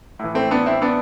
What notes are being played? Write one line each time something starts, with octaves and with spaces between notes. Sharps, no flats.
A2 E3
A3 C4
B3 D4
C4 E4
B3 D4